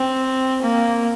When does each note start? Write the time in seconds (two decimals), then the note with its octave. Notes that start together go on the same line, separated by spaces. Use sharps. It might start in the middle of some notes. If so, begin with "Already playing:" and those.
Already playing: C4
0.62 A#3